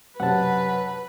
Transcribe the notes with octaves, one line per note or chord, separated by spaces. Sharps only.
F#2 C3 B4 F#5 A5